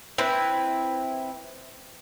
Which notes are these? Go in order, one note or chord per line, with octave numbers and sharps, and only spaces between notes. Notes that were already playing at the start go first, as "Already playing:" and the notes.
C4 E4 B4